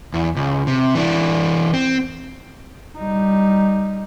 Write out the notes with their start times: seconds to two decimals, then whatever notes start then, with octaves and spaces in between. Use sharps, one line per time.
0.14 E2
0.36 C#2
0.67 C3
0.95 E3 D4
1.74 C4
2.98 G3 D#4